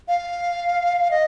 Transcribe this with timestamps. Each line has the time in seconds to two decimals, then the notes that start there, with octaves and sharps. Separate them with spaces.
0.08 F5
1.11 D#5